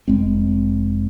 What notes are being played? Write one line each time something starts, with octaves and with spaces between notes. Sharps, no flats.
F1 G#3 C4